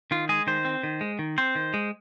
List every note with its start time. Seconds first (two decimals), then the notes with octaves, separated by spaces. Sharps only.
0.11 D#3 F4
0.29 G#3 G#4
0.47 D#3 C5
0.65 C4
0.83 D#3
1.01 G#3
1.19 D#3
1.38 C4 C5
1.55 D#3
1.74 G#3